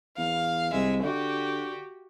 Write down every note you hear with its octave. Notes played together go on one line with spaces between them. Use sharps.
E2 F5
C2 G#3 E5
D3 F#4 G4